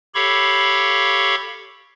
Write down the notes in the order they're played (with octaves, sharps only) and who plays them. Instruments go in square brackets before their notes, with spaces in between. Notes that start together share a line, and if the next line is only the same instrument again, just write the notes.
[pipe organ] G4 A4 C#5 F5 B5 C#6